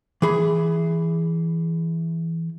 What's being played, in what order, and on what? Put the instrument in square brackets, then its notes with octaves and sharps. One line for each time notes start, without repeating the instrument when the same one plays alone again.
[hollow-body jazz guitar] E3 G#4 B5